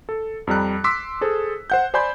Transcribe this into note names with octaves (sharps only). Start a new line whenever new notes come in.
A4
F2 G3 A#5 F#6
C6 D6 E6 B6
G#4 A4 C5
C5 F#5 G6
C5 D5 G#5 B5 C6 G6